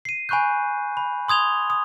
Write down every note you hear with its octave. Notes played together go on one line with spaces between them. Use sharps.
C7 D#7
G#5 B5 C#6 F#6 G6
B5
C6 D#6 G#6 F7 G7
D#6